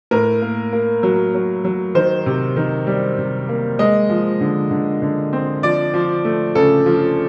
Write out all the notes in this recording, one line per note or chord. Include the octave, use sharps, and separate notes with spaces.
A2 A#4
A#3
A#3
F#3
F#3
F#3
D#3 C5
C3
D#3
G3
C3
A#3
G#3 D#5
F3
D3
D3
D3
C4
F3 D5
F3
A3
C#3 A4
F3